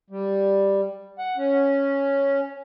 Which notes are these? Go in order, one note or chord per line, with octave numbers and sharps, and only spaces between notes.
G3
F#5
C#4